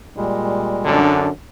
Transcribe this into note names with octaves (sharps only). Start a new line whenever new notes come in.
A#2 G3 G#3
F#2 D3 D4